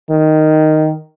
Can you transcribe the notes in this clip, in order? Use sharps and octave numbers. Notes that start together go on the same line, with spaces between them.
D#3